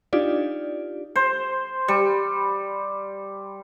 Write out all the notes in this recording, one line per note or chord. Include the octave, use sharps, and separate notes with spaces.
D4 D#4 F4 G4 D5
C5
G3